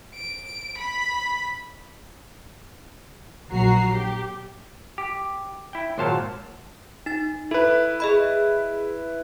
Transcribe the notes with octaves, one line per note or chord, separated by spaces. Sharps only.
D7
B5
A#1 F#3 F#4 A#5 C7
G4
G4
E4 G5
G#1 A#2 F#3 C5 F5 A5
D#4 A6
E4 A4 B4
G#4 D#5 B5